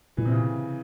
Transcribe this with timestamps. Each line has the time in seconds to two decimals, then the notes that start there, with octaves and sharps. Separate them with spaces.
0.17 A#2 E3
0.25 C3
0.32 C#3